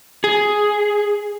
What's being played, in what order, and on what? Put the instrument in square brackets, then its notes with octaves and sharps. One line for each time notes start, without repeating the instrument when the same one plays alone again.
[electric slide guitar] G#4